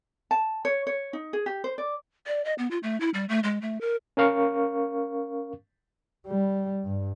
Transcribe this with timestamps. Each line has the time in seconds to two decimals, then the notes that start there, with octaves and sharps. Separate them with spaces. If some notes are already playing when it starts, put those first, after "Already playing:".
0.31 A5
0.65 C#5
0.87 C#5
1.13 D#4
1.33 G#4
1.46 G4
1.64 C5
1.78 D5
2.27 D5
2.45 D#5
2.58 B3
2.71 F4
2.83 A3
3.00 E4
3.14 G3
3.29 A3
3.43 G#3
3.62 A3
3.81 A#4
4.17 C#4 A#4 F5 C#6
6.27 G3
6.84 G2